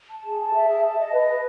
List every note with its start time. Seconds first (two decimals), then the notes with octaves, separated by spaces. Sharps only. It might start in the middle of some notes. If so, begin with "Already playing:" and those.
0.10 A5
0.25 G#4
0.39 A5
0.54 E5
0.68 G#4
0.84 A5
0.98 D#5
1.13 B4
1.28 B4